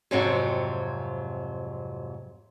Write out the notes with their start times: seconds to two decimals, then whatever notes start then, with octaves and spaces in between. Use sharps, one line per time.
0.11 F2 G#2 C3 F#3 C4 F#4